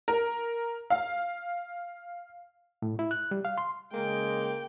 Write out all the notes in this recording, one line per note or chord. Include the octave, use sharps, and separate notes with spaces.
A#4
F5
A2
E4
F#6
G3
F5
C6
C#3 G#3 A#3 G5